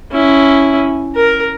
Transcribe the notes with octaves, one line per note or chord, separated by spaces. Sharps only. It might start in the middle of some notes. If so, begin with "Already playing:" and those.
C#4 E4
A#4